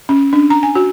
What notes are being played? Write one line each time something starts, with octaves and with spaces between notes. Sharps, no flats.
C#4
D4
A#5
G#5
F#4